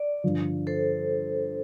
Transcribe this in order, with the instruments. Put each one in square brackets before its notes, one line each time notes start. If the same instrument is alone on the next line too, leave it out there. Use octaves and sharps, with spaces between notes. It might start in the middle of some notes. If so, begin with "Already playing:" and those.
Already playing: [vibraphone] D5
[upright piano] G2 D3 F3
[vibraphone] A4 C5